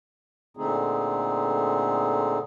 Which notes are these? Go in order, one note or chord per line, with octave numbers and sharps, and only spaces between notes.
A#2 D3 A3 C4 D#4 G#4